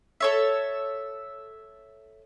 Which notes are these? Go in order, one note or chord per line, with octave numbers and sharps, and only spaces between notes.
A4 C#5 E5